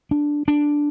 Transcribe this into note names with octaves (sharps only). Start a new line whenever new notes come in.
D4
D4